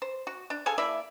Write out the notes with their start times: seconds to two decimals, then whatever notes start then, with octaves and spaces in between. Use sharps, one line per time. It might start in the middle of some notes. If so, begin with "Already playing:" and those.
0.02 C5
0.27 F#4
0.50 D4
0.66 G#4 A4 F5 G#5
0.78 A#3 E4 D5 E5